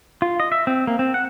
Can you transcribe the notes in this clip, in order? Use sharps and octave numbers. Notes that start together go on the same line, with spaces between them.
F4
D#5
E5
C4
A#3
C4
F#5